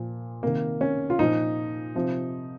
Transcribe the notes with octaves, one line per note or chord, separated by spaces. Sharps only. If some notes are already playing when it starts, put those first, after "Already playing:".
Already playing: A#2 F3
C3 D#3 A#3
C#4
F4
A#2 F3 D#4
C3 F3